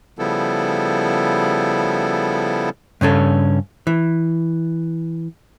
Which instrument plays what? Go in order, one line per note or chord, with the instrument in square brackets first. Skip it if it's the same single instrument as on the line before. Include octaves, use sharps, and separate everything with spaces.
[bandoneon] C#3 F3 G3 B3 E4 A4
[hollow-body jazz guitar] G2 C#3 C#4 A4
E3